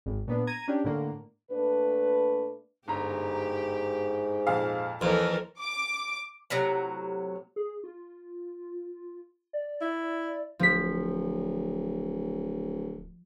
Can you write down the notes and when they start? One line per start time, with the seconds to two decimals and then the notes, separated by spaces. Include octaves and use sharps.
0.06 G#1
0.28 A#2 B3 D4
0.47 A#5 G#6 D#7
0.68 C#4 D4 G4
0.84 A2 D3 A#3
1.51 A#2 A3 D4 B4
2.88 G1 G#2 G4 A#5
4.47 F2 A#2 F5
5.01 F2 E3 A#3 A4 A#4
5.59 D6
6.50 A2 C3 F#3 A#5
7.56 G#4
7.84 F4
9.53 D5
9.81 E4
10.59 D1 F3 B6